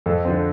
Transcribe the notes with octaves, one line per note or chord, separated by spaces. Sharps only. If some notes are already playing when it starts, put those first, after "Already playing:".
F2 A4
D3 F3 C4